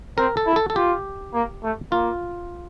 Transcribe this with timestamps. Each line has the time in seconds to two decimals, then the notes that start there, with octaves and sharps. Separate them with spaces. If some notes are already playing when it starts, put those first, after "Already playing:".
0.18 C4 A#4
0.37 A4
0.47 E4
0.56 A4
0.70 A4
0.75 F4 G4
1.34 A#3
1.63 A3
1.92 A#3 F4